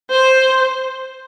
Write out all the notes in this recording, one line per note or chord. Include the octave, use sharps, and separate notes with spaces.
C5